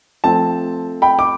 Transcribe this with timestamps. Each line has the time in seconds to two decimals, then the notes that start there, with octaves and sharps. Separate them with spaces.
0.24 F3 A3 C4 A5
1.02 G5 B5
1.19 D6